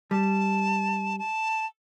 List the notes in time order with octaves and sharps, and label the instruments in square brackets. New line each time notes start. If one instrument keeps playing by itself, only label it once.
[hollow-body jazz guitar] G3 [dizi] A5
[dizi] A5